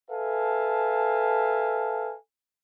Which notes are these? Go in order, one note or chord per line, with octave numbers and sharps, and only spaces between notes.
A4 B4 E5 F5 G#5 A5